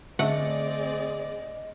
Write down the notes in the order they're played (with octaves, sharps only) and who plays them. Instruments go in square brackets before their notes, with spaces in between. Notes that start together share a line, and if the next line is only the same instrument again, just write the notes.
[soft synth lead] D3 [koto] A3 F#5 [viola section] C4 G#4 D5 [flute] D#5